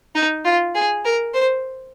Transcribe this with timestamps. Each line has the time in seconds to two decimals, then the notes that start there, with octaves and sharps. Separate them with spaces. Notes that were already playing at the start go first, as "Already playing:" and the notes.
0.15 D#4
0.45 F4
0.75 G#4
1.05 A#4
1.34 C5